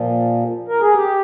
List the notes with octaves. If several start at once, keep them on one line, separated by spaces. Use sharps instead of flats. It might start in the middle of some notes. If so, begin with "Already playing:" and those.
Already playing: A#2 F3
A#4
G#4
G4